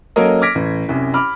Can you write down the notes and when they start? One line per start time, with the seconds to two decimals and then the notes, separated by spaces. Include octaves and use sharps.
0.16 F#3 A#3 C#4 A4 A#4 D#5
0.42 D6 F6 G#6 A#6 B6 D7
0.55 A1
0.89 C2 F#2
1.14 B5 D6 F6